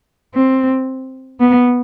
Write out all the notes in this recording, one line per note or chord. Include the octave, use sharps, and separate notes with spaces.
C4
B3